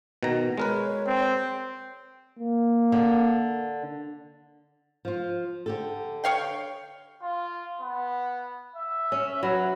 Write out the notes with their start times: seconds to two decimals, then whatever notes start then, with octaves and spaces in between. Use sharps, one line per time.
0.23 B2 D#3 A#5
0.58 G#3 A#4 B4 C#5
1.07 C4
2.39 A#3
2.92 D3
5.05 F3 F4
5.66 D3 G4 A4
6.24 C#5 F5 G5
7.22 F4
7.81 B3
8.76 E5
9.12 C#4
9.43 F#3 B4